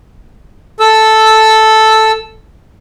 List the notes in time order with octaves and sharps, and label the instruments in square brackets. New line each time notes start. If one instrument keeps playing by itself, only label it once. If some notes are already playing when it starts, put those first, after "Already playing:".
[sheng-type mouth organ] A4 E6